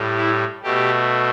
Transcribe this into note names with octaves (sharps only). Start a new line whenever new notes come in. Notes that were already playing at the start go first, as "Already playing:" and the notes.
Already playing: A2 G3
E4
B2 A3 G4